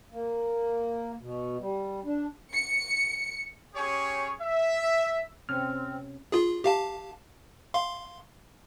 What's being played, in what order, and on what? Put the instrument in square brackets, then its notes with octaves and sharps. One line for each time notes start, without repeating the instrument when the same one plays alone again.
[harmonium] A#3
B2
G3
D4
[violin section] C#7
[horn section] C#4 G4 G#4 C#5
E5
[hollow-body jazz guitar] C3 C#4 [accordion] C4 [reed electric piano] F6
[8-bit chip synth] F4 G#4
G4 F5 A5
F5 C6